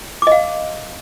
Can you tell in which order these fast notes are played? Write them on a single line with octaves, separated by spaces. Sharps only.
D6 D#5 F5